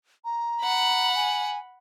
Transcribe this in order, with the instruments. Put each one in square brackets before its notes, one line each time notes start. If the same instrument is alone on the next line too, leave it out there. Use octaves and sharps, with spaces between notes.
[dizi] A#5
[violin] F#5 B5
[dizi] G#5